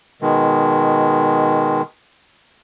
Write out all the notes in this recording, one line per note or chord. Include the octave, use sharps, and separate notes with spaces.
B2 D#3 G#3